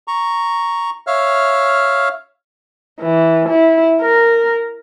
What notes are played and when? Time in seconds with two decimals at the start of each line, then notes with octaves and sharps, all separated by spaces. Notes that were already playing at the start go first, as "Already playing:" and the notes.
0.08 A#5 C#6
1.07 C#5 E5 F5 F6
3.01 E3
3.49 E4
4.01 A#4